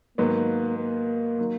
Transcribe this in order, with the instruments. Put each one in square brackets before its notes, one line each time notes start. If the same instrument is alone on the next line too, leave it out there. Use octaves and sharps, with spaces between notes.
[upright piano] G#2 D#3 F#3 B3 [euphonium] A#3
[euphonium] A#3
[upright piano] D#3 F#3